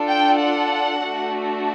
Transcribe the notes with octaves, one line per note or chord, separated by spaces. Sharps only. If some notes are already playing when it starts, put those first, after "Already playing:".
Already playing: D4 F4 A4
G5
F#5
A3 D4 F#4 A4